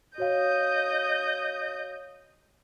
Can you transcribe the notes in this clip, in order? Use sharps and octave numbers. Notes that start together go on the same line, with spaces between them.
F#4 C#5 D#5 F5 G6